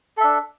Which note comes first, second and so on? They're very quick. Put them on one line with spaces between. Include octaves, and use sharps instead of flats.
A4 E5 D4